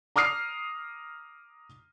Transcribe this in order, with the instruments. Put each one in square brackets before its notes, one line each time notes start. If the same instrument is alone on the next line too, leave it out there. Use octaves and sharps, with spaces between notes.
[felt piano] A#5 D6 D#6 F6 C7